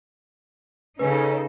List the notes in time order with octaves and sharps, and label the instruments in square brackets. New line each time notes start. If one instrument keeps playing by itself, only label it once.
[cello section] C#3 D#4 A4 [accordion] C#4 [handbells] B4